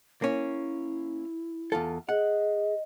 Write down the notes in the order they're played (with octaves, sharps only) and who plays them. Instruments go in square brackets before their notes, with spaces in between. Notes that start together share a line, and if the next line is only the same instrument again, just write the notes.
[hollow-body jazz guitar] A#3 C#4 [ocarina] E4
[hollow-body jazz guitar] E2 F4 A4
[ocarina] G#4 [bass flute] D#5 [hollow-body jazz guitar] F#5